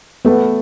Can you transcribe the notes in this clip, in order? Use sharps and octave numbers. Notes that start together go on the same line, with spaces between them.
A3 B3